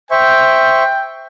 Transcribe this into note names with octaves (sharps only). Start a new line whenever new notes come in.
C5 E5 G5 C#6